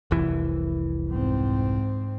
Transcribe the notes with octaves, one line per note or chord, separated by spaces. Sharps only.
F1 C2 E3
G#2 C4